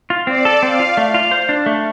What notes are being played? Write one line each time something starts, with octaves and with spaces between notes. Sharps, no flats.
F4
C4 D5
A4
C4 F5
F4
A3
F4
C5
D4
A3